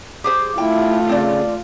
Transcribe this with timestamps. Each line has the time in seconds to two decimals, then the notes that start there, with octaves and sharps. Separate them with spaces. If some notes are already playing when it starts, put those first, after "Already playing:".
0.24 G4 G#4 C5
0.58 A3 E4 F4 G5
1.09 C#3 C4 D5